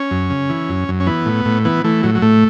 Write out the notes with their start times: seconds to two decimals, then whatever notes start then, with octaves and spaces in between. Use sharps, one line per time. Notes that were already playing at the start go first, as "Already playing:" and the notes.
Already playing: C#4
0.11 F#2
0.30 C#3
0.49 E3
0.69 F#2
0.88 F#2
1.00 C#4
1.07 E3 B3
1.26 A2
1.45 A2
1.65 E3 B3
1.84 E3 A3
2.03 A2 F#3
2.15 F#3
2.22 A2 A3